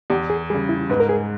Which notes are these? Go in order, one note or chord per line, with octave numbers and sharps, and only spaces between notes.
E2 G4
G#4
C#3 G3 G#4
E4
G#2 B4
A#4
G#4